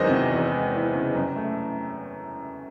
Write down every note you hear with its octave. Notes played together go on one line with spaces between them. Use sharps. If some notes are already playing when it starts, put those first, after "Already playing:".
Already playing: E2 D#3 F#3 G#3 C5 D#5
C3
E2
G#3
E3
C#3
F#2
A3